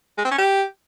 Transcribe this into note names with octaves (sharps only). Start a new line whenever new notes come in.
G#3
C4
C#4
G4